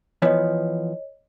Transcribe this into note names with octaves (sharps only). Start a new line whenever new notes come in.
E3 F3 B3 C#5 D#5